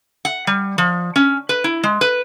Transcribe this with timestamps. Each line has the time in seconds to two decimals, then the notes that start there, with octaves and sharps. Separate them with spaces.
0.25 F#5
0.47 G3
0.78 F3
1.16 C#4
1.49 B4
1.64 E4
1.83 G#3
2.01 B4